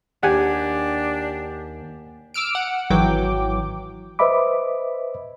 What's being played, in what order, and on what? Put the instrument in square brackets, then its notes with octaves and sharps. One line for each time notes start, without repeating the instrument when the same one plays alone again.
[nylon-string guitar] D#2 [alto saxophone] D4 [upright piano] G4 [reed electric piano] F#5 G#5
[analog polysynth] D6 E6 F6 D7
F#5
G#1 E3 F#3 G5 D6
[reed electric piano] B4 C5 D#5 E5 B5 D6